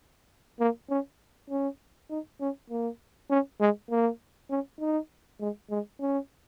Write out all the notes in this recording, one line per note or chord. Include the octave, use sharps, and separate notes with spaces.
A#3
C#4
C#4
D#4
C#4
A#3
C#4
G#3
A#3
C#4
D#4
G#3
G#3
C#4